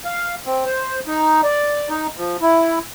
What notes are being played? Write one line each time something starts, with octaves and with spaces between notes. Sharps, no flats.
F5
C4
C5
D#4
D5
D#4
F3
E4